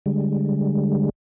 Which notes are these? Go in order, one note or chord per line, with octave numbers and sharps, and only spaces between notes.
D3 G3 G#3